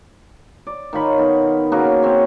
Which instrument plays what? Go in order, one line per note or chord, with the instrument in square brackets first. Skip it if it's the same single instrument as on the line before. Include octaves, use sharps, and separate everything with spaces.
[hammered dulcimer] D5
D#3 F4 C#5 B5
D#3 B3
A#3 C#4 F#4 G#4
C4 C5 C#5